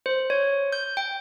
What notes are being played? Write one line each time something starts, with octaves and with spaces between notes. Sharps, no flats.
C5
C#5
G6
G5